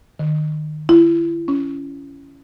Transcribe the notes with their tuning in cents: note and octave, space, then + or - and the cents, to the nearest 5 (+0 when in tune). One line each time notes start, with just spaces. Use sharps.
D#3 -30
E4 +35
C#4 +5